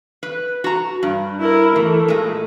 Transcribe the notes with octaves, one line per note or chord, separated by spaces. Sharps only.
B4
F#4 A#5
G2
E4 A#4
E3 A3
A#2 G#3